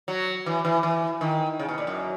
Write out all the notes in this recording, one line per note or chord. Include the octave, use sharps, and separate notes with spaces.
F#3
E3
E3
E3
D#3
C#3
B2
A#2
F#2